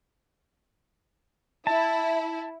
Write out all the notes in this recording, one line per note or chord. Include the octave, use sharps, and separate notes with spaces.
E4 A5